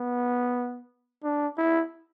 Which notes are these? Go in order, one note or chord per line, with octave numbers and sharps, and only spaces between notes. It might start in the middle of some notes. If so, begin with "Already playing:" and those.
Already playing: B3
D4
E4